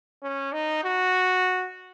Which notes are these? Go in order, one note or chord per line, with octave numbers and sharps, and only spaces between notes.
C#4
D#4
F#4